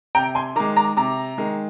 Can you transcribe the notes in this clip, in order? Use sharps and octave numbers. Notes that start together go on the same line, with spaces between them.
C3 G5 A#5
G#5 C6
D#3 G#3 A#5 D6
A#5 D6
C3 A#5 D6
D#3 G#3